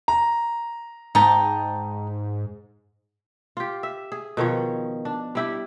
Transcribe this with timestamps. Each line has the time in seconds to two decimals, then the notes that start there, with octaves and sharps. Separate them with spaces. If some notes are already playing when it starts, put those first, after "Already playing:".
0.08 A#5
1.15 G#2 D#4 G5 A5
3.57 F4 G4
3.83 E5
4.12 G#4
4.37 B2 D#3 F3 C#5
5.05 D4
5.35 G3 E4 G4